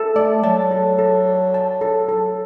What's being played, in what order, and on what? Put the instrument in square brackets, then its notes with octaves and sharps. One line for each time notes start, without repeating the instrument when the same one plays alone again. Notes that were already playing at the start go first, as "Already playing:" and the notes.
Already playing: [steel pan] A4
[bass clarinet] A3 [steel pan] D5
[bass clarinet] F#3 [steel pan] A5
[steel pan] A4
A4
D5
A5
A4
A4